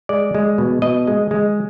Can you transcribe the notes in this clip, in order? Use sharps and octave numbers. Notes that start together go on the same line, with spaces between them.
G#3 D5
G#3
B2
B2 D#5
G#3
G#3